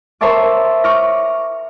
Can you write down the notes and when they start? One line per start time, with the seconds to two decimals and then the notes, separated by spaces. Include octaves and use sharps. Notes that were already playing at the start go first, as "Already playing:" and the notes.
0.21 A#4 C5 C#5 E5 A5 D6
0.84 C#6 D6 F6 A#6